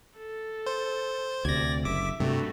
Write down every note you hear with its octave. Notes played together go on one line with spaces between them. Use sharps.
A4
C5
D2 C3 D5 G#6 A#6
F#1 E5 D6
G2 C3 A3 F#4